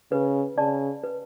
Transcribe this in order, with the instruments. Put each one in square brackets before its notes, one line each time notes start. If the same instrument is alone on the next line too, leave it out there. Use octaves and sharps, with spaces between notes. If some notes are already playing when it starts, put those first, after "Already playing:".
[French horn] C#3 [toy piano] B4
[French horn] C#3 [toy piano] D5 A5
[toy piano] B4